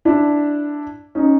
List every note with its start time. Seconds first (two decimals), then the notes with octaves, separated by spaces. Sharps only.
0.05 D4 E4
1.15 C#4 D#4